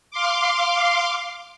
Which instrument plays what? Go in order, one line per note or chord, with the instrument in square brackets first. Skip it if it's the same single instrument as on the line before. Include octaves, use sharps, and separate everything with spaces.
[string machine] F5 C6 D6